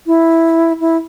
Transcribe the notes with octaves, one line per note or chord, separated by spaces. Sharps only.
E4
E4